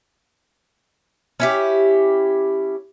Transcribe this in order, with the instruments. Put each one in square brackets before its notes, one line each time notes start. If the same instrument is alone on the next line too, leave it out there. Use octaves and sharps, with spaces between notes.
[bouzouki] C#4 E4 G4